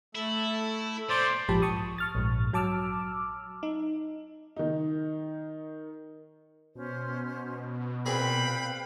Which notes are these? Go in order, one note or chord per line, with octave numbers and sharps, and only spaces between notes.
A3 E4 A4
A#2 A3 C5 D5
A#1 G#2 F3 G4 A5 B5
A5 C#6 D#6
C#6 F6 A6
A#1 G#2
F#3 A5 D6 E6 F6
D#4
D#3 D#4
B2 C#4 C5
A#2 C4 G#4 B4 F5 G5 B5